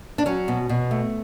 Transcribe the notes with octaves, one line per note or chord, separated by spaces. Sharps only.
D4
F#3 C#4
B2
B2
A3